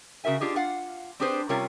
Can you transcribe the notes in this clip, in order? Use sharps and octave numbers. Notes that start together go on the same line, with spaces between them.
C#3 F#4 A#4 E5 G#5
D4 F4 G4 G#4 D#5
F4 F5 F#5
C4 D4 G4 G#4 B4 C5
C3 G3 C#4 F4 A#4 C#5